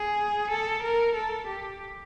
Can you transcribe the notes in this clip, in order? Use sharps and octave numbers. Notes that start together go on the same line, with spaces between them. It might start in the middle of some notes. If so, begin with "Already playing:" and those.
Already playing: G#4
A4
A#4
A4
G4